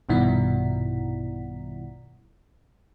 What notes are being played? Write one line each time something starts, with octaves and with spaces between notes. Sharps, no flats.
A#1 G2 B2 D#3 E4